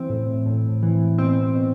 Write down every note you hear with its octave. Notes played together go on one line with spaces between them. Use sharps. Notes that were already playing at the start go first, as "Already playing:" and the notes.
Already playing: E3 C4
A2
A2
E3
B2 C4
B2